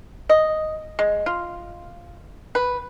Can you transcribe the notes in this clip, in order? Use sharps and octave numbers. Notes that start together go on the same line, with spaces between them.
D#5
G#3
F4
B4